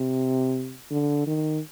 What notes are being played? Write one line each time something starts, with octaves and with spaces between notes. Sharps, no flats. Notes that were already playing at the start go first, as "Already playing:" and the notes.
Already playing: C3
D3
D#3